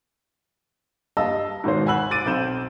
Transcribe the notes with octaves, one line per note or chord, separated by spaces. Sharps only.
G2 D#5 F5 A5 E6
G#2 B2 D#3 C5
F#5 G#5 B5 E6 F#6 F#7
D6 A6 D7 D#7
B1 C4 G6 E7